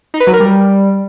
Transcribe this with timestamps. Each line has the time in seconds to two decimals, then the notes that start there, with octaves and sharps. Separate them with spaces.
0.14 D#4
0.20 B4
0.27 F#3
0.33 A#4
0.40 G3